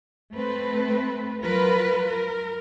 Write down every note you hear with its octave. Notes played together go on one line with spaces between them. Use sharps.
A3 C4 B4
F#3 F4 A#4 B4
A#4